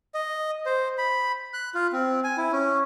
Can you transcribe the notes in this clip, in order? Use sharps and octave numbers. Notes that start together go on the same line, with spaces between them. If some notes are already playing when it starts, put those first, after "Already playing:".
D#5
C5
B5
F#6
F4
C4
G#5
E4
C#4